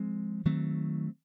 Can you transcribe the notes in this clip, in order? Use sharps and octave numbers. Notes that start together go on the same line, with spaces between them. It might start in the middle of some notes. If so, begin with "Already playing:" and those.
Already playing: F3 G#3 C4
D#3 F#3 A3 C4